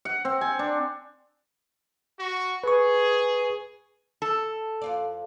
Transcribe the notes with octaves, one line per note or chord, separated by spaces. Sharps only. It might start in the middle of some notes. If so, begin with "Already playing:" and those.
F#5
C4
G#5
D4
F#4 C#6
G#4 B4 C#6
A4
F2 F4 D5